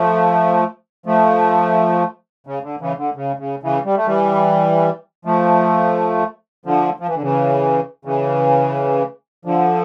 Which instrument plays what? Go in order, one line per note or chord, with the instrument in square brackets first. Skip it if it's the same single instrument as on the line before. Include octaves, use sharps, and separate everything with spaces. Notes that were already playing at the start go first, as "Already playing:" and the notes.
Already playing: [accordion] F3 A3
F3 A3
C#3
D3
C#3 E3
D3
C#3
C#3
C#3 E3
G3
A3
E3 G3
F3 A3
D3 F3
F3
E3
D3
C#3 E3
C#3 E3
D3 F3